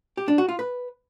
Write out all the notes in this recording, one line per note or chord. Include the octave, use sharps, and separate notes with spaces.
G4
D4
F#4
F4
B4